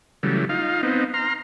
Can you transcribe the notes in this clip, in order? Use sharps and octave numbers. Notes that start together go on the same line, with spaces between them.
C#3 E3 F#3 G3 A3
D#4 F4 F5
B3 C4 D#4
A#5 C6 F6